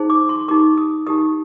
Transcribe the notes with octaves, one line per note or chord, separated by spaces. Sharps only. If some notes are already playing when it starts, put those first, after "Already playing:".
Already playing: D#4 G#4 C5
D6
C6
D#4 G4 A#4 D6
D#6
D#4 G4 A#4 D#6